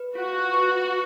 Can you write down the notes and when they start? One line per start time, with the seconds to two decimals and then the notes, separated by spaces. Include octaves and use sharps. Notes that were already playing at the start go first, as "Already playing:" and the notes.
Already playing: B4
0.15 F4 F#4
0.54 B4